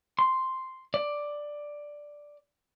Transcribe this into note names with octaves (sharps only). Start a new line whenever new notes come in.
C6
D5